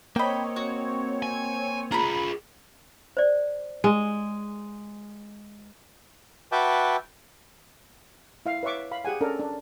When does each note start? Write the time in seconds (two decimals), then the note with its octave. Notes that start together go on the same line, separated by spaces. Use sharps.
0.16 A#3 C4 C#5 D#5 G5 B5
0.56 F#4
1.23 G#5
1.92 F4 G#4 A#5 B5
3.17 C5 D5
3.84 G#3
6.52 F#4 B4 E5 G5 A5 D6
8.46 E4 E5 F5
8.63 B4 C#5 E5 C#6 D6
8.91 F5 B5
9.05 G4 G#4 F#5 G#5
9.21 C#4 D4 A4 A#4
9.40 D4